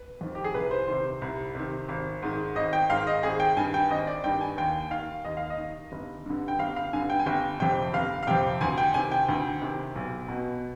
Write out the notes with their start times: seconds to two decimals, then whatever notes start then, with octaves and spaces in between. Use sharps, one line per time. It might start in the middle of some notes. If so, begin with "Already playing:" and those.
Already playing: B4
0.21 F2 D#3
0.35 G4
0.44 G#4
0.54 C2 B4
0.71 C5
0.87 C3 D#3 C5
1.22 C2
1.55 C3 D#3
1.89 G#1
2.22 G#2 D#3
2.56 G#1 D#5
2.73 G5
2.89 G#2 D#3 F5
3.07 D#5
3.23 G#1 G#4
3.40 G5
3.57 G2 D#3 G#5
3.74 G5
3.90 G#1 D#5
4.07 D5
4.24 G2 D#3 G5
4.41 G#5
4.57 D#2 G5
4.91 D#3 F5
5.25 D#2 D#5
5.37 F5
5.50 D#5
5.58 D#3
5.92 G1
6.26 G2 D3
6.48 G5
6.59 G1 F5
6.76 F5
6.93 G2 D3 G#5
7.10 G5
7.19 G#5
7.26 G1 G5
7.60 F2 C3 G5
7.93 G1 F5
8.23 F5
8.27 F2 C3 G5
8.61 D2 G#5
8.78 G5
8.94 C3 D#3 G#5
9.12 G5
9.29 D2
9.62 C3 D#3
9.96 B1
10.28 B2